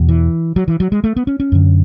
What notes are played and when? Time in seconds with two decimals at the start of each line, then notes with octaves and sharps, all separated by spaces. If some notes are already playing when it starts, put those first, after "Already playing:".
Already playing: E2 B2
0.09 E3
0.56 F#3
0.68 E3
0.80 F#3
0.92 G#3
1.04 A3
1.16 B3
1.27 C#4
1.40 C#4
1.52 F#2 D3